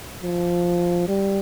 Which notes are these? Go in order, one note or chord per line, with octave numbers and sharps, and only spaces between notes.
F3
G3